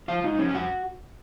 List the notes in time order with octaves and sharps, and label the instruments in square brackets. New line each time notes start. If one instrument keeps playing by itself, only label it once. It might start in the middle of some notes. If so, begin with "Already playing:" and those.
[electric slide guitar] F3 F4 F5
G#2 D#4 D#5
F3 C#4 C#5
G#5
F2 F#4 F#5